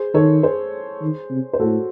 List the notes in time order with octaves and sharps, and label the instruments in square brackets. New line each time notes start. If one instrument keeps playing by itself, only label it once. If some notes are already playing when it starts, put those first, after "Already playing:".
Already playing: [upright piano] G#4 C5
[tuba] D#3 [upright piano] A4 C#5
[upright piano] G#4 C5
[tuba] D#3
C3
[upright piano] C5
[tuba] A2 [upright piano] F#4 A4